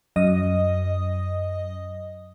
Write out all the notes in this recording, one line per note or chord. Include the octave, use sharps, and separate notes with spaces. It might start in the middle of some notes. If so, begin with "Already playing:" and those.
F#2 D#5 D#6